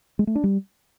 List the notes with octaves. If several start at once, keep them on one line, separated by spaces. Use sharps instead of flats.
G#3
A3
D4
G3